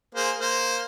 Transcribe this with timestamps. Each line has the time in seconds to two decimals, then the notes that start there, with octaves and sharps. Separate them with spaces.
0.15 A#3 G#4 C5
0.40 A#3 C5